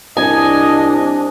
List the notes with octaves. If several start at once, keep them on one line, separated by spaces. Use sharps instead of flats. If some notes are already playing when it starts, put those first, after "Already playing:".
C2 D4 D#5 G#5